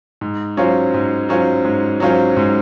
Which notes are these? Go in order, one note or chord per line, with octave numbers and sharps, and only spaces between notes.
G#2
F#3 C#4 F4 C5
G#2
F#3 C#4 F4 C5
G#2
F#3 C#4 F4 C5
G#2